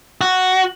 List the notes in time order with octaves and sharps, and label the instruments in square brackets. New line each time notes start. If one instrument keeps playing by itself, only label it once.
[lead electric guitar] F#4